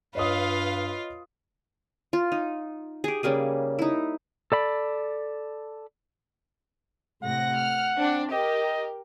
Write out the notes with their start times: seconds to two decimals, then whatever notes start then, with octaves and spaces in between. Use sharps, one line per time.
0.15 G2 F4 B4 C#5 D#5 F5 D#6
2.13 F4
2.32 D#4
3.04 G4 G#4
3.23 C#3 G3 A#3 G#4
3.79 D#4 E4
4.52 A4 D5 B5
7.23 A2 C3 F#5 A#6
7.55 F6
7.97 C4 D4
8.31 G4 A#4 D#5